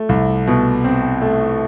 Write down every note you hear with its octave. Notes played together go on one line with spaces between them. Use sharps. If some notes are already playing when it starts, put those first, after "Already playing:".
Already playing: A3
C2
B2
C4
A3